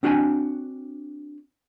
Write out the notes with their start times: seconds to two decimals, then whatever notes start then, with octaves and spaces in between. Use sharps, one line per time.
0.03 C4 D4 F#4 G5 G#5